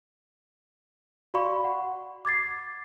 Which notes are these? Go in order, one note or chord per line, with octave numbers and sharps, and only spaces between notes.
F#4 D5 F5 B5 C#6
F#5
D6 G#6 A6 C7